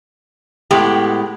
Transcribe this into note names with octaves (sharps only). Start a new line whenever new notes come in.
A2 G#3 B3 G4